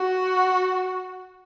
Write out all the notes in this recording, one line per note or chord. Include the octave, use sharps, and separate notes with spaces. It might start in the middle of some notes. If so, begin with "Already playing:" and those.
Already playing: F#4